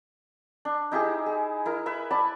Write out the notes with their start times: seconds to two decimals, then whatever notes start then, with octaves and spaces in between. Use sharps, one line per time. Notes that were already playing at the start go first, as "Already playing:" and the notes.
0.65 D4
0.91 D#4 E4 G4 G#4
1.26 G#4
1.66 E4 A#4
1.86 B4 E5
2.11 D5 A5 B5